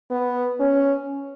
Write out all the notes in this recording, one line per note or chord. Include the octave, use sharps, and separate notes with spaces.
B3
C#4